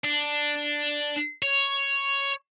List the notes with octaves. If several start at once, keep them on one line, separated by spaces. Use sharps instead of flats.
D4
C#5